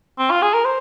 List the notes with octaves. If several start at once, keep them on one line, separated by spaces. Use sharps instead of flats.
C4
F4
G#4
A#4
C5